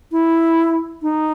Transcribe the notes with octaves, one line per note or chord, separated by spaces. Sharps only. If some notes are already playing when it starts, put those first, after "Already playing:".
E4
D#4